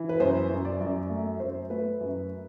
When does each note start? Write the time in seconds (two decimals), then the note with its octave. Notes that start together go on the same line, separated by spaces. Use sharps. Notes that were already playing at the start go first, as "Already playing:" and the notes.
Already playing: E3
0.09 B4
0.20 F#2 C5
0.49 F#2
0.65 D5
0.81 F#2
1.10 A3
1.40 F#2 C5
1.70 A3 B4
2.00 F#2